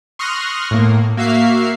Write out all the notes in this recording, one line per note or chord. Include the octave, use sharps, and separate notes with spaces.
C6 C#6 D#6 F6 F#6 A#6
A2 A#3
A#3 F#4 E5 F5 C7